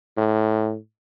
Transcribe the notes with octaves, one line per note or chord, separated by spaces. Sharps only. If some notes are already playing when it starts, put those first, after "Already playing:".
A2